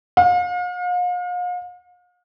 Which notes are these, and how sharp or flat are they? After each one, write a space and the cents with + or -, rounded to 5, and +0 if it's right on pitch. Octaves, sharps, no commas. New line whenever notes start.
F5 +40